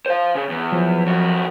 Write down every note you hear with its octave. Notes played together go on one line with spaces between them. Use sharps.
C5 F5
C#3
E2
F3 F#3
F2 F#4